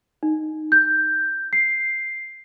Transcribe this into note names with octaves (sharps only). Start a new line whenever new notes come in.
D#4
G6
C7